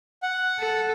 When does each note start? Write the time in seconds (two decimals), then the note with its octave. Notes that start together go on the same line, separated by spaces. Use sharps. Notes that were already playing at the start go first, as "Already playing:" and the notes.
0.23 F#5
0.59 A4